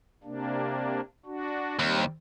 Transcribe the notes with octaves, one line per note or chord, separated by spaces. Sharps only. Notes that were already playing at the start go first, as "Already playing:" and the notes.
C3 A#3 D4
D4 F#4
D#2 G3 C4